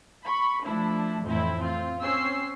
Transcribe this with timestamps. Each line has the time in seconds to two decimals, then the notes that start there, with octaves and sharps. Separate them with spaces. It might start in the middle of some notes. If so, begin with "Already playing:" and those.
0.24 B5 C#6
0.64 F3 A3 D4 E4
1.24 F2 A2 E3 C4 E4
1.60 C4 F4
2.01 C4 C#4 E6 C7